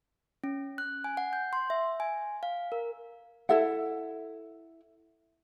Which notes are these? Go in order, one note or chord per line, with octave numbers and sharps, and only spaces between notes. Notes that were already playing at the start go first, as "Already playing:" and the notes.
C#4
F#6
G#5
F#5
G6
C6
E5
G#5
F5
A#4
E4 A4 E5 F#5